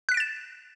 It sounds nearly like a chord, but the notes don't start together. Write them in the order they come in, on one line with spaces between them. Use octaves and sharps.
F#6 B6 D7 A6 E7